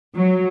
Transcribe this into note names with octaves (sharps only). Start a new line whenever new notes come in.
F#3